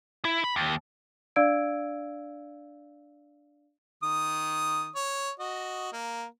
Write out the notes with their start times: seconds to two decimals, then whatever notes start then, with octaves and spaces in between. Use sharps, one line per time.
0.25 E4
0.44 B5
0.56 D#2
1.36 D4 D5 F5 E6 G#6 D7
4.03 D#3 D#6
4.95 C#5
5.40 F#4 D#5
5.92 A#3